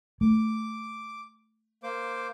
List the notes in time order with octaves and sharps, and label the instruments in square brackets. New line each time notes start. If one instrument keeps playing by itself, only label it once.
[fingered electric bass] A3 [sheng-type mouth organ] D6
[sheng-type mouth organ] A#3 C5 D6